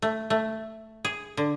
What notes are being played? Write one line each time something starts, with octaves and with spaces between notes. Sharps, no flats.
A3
A3
G#4
D3